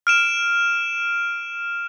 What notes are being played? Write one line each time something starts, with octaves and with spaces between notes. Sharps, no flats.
F6 D7 E7